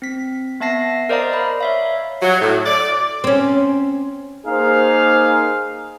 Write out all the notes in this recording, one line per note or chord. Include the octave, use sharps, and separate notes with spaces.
C4 B6
B3 E5 A5 A#6 C7
A#4 C5 D5 D#5 F5 A#5
B5
C#5 E5 F5
F#3
A2
D5
C4 C#4
A#3 D#4 G#4 C5 F5